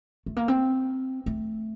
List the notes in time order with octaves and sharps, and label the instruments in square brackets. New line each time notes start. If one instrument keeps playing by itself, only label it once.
[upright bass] A3
A#3
C4
A3